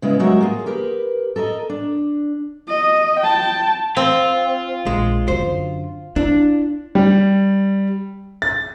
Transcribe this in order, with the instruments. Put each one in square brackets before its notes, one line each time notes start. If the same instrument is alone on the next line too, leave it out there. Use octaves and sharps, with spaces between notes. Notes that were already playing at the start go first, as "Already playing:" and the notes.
[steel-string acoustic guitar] C#3 G#3 B3 E4
F#3 G#3 F#4 G4 A#4 E5
A#3 F4 G#4
G4 A#4 B4
A4 A#4 C#5 D#5
D4
[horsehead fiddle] D#5
G5 A5
[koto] C4 [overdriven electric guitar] F4
[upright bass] A#1 [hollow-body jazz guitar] G#3
[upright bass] F#2 D3 [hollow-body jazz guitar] C5
[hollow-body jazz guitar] D4 [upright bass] E4
[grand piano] G3
A6